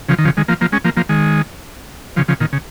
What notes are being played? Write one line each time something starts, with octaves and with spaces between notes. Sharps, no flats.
C#3 F3
D#3
C#3 F3
D#3 G#3
F3 A#3
F3 A#3
G#3 C#4
F3 A#3
F3 A#3
D#3 G#3
C#3 F3
C#3 F3
A#2 D#3
C#3